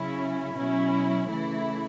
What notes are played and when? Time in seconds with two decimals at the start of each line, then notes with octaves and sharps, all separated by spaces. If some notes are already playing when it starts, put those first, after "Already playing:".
Already playing: C#3 F#3 C#4 E4
0.56 B2 F#3 C#4 E4
1.29 C#3 E3 A3 E4